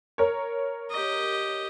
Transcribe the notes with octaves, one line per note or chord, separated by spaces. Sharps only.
A#4 C#5
G4 D#5